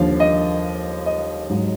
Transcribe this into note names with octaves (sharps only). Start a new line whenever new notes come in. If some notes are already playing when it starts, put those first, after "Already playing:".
Already playing: D#2 D3 F3 F5
D#5
D#5
G#2 F#3